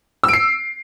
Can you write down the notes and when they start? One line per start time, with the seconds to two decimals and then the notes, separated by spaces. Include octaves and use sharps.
0.24 E6
0.28 D7
0.33 C7